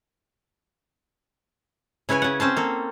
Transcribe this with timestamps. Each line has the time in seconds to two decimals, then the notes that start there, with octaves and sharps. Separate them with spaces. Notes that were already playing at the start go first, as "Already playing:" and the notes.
2.09 C#3 E4 B4 C#5 G#5
2.22 C#3 F#5
2.40 C4 C#4 C5 A5
2.57 A#3 A4